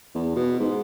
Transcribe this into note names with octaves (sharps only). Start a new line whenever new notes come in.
E2
B2
G#2